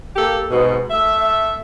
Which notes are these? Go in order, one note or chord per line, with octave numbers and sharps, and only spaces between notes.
A#3 G4 A4
G#2 B2
A3 E5